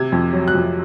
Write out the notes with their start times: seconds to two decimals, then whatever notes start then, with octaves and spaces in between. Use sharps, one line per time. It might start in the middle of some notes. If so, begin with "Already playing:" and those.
Already playing: C3 G#6
0.12 F2
0.33 F#3
0.48 F#6
0.55 F2